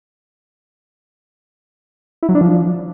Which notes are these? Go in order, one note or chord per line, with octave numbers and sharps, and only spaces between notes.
E4
F#3
D4
F3